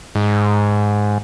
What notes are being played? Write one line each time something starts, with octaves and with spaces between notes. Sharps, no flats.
G#2